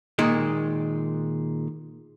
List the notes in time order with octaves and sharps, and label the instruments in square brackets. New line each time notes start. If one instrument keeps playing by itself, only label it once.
[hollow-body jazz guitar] A#2 D#3 G#3